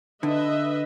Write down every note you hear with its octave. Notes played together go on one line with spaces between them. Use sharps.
D3 B4 D#5 E5